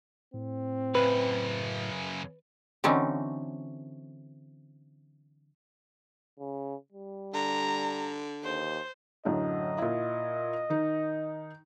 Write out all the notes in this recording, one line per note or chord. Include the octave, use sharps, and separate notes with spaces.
A2 C4
F#2 C#3 B4
D3 E3 F#3 C4 C#4 D#4
C#3
G3
D3 A#5
D#2 C5
F#2 A2 D3 D#5
A#2 E4
D#3 D#4